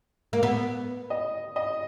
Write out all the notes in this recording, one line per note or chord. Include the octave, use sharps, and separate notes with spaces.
A#3
B3
D#5
D#5